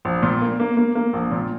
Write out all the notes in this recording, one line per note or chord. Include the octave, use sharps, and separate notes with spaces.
A#1
A#2
A#3
A#3
A#3
A#3
A#1
A#2